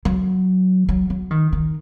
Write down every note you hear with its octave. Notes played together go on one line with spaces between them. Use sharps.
F#3
F#3
F#3
D#3
D#3